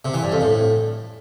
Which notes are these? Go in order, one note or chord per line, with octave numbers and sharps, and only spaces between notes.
C3
E3
G2
F2
A2